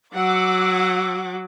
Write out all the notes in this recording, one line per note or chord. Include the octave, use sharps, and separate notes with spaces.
F#3 F#5 D6 E6